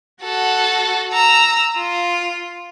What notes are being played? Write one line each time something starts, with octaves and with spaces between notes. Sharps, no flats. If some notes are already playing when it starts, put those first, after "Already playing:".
F#4 A4 F#5
A#5 E6
F4